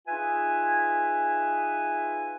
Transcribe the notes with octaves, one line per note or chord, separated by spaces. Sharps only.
D#4 F4 G#4 B4 E5 G#5